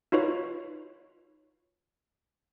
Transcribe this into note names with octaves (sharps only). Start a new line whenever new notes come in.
D#4 F4 F#4 B4 C#5